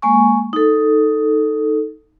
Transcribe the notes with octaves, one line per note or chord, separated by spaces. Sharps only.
G#3 A#3 G#5 C#6
D#4 A4